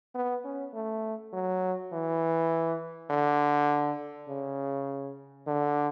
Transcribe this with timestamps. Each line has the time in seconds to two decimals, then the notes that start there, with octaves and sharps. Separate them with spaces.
0.15 B3
0.44 C#4
0.74 A3
1.33 F#3
1.92 E3
3.10 D3
4.28 C#3
5.47 D3